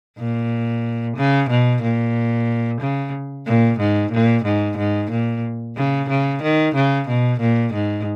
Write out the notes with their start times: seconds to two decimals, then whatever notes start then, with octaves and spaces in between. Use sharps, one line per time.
0.18 A#2
1.16 C#3
1.49 B2
1.82 A#2
2.81 C#3
3.46 A#2
3.80 G#2
4.12 A#2
4.44 G#2
4.77 G#2
5.11 A#2
5.76 C#3
6.09 C#3
6.42 D#3
6.75 C#3
7.08 B2
7.40 A#2
7.73 G#2